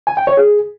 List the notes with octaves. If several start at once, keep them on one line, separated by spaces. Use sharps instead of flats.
G#5
G5
C#5
G#4